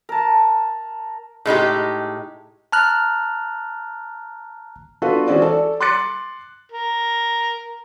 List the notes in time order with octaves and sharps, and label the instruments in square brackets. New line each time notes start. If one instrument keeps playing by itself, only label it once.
[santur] A#4 A5
[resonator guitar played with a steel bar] A2 G#3 D#4 G4
[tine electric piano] A5 A#5 F6 F#6
[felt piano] B3 D4 F4 F#4 A4 B4
E3 G#3 C4 C#4 F#4 D5
A4 D5
C6 D6 F#6 A6 C#7
[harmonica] A#4